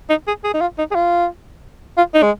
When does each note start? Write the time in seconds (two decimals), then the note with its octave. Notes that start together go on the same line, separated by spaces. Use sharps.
0.10 D#4
0.27 G#4
0.44 G#4
0.54 D#4
0.61 F4
0.78 D#4
0.91 G#4
0.95 F4
1.97 F4
2.14 D#4
2.23 G#3